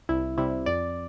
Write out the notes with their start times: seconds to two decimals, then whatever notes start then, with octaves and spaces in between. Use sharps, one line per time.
0.09 C2 E4
0.38 C3 G3 E4
0.66 F2 D5